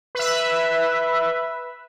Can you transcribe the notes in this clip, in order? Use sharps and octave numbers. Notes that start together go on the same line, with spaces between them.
B4 E5